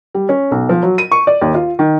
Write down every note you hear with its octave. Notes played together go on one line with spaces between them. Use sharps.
G3
C#4
B1
F3
F#3
D#7
C#6
D5
D#2
F4
D#3